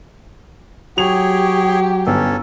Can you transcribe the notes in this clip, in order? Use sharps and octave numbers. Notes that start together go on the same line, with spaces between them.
F#3 G4 G#4 C#5 F7
G1 C#4 A4